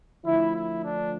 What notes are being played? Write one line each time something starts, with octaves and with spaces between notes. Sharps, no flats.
D3 F3 A3 E4
E4
D4